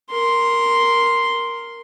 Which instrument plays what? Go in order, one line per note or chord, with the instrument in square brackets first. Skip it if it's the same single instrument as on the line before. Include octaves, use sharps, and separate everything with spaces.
[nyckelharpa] A#4 C6